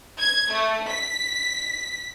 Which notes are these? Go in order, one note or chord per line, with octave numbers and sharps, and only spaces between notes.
G#6
A3
B6